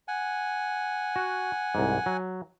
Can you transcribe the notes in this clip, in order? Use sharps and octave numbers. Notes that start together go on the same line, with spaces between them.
F#5 G#5
F#4
C2 G#2
F#3